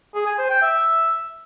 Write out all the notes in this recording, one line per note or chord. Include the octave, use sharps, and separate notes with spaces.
G#4
G#5
C5
G5
E5